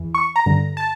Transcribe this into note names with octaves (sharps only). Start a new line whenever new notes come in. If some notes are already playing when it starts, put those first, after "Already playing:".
Already playing: E2 E3
C#6
A#5
G2 D3
A5